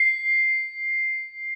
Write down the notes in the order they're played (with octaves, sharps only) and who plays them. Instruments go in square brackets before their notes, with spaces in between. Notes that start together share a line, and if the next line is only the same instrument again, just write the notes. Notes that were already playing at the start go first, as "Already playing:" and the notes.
Already playing: [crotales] C7